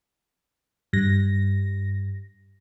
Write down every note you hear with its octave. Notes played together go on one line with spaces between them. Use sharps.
G2 A#6